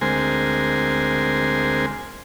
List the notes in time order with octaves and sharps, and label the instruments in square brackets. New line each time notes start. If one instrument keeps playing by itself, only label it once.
[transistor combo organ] D2 G#3 C4 A#4 C5 G#5